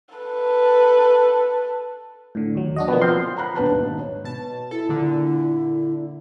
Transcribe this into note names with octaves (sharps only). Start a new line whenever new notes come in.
A4 B4
A2 D3
D#2 F#3
D4 F#4 D#5
B2 F3 A#3 B3
F3 C4 C6
F#5 A#5 B5 F#6
D#1 B3 D4 B4 A5 F#6
G#1 D#4
C#5
B2 A5
E4 A4
A#2 D3